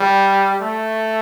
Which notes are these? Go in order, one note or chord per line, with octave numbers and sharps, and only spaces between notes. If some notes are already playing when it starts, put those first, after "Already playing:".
Already playing: G3
A3